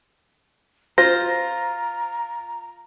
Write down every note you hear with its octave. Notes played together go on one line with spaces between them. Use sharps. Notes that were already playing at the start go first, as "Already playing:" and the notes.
F4 C5 A#5 A#6